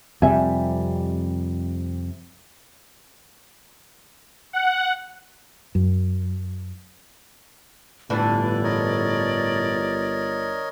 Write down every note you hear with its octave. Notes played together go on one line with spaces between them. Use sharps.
F2 C3 G3 E5 G#5
F#5
F#2
G1 A2 D3 E3 D5
A#4 C#5 D#5